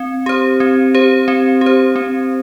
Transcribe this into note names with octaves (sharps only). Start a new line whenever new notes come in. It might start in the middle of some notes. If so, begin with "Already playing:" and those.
Already playing: C4
G4 C5
C4
G4 C5
C4
G4
C5
C4